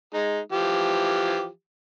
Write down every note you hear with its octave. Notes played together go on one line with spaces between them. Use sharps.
G#3 D#4
E3 F3 G4